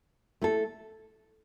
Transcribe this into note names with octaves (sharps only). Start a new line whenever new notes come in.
A3 E4 A4